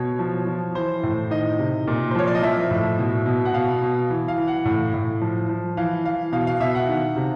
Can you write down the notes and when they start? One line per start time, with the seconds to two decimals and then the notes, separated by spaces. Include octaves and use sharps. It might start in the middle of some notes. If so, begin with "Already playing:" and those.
Already playing: B2 C#5
0.19 F3
0.47 F3
0.75 E3 C5
1.03 A2
1.31 D#3 D#5
1.59 C3
1.87 A#2
2.11 C5
2.15 F3 C#5
2.27 D5
2.35 D#5
2.43 F3 E5
2.71 A2
2.99 B2
3.26 B2
3.45 F#5
3.54 B2 F5
3.82 B2
4.10 E3
4.28 F5
4.38 E3
4.48 F#5
4.65 A2
4.94 A2
5.22 F3
5.49 F3
5.77 E3 F5
6.05 E3 F5
6.32 B2 F5
6.47 F5
6.60 B2 E5
6.75 F#5
6.88 D#3
7.16 C3